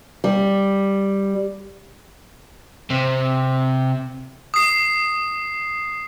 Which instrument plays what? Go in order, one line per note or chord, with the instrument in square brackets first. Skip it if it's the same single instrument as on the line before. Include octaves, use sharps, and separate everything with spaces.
[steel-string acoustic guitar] G3
[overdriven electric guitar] C3
[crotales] D#6 C7